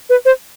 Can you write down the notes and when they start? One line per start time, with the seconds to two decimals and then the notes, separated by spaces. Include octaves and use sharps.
0.10 B4
0.25 C5